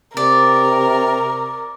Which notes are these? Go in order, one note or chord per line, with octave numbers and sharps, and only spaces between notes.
C3 A#4 D5